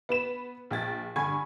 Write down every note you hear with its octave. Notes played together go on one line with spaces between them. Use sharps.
B3 B4 E7
A#1 G5 A6
G2 D3 G#5 B5 C#6 G#6